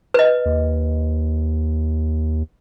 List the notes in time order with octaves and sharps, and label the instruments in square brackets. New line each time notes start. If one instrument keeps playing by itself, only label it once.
[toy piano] B4 D#5
[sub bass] D#2